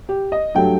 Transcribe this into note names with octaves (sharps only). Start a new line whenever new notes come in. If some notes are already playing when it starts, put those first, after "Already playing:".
G4
D#5
G2 F#3 A3 G5